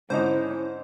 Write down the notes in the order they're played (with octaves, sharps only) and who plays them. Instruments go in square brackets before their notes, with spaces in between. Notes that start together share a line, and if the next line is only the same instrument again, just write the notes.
[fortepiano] G#2 D3 D#4 [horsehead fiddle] C#4 E4 [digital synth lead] C5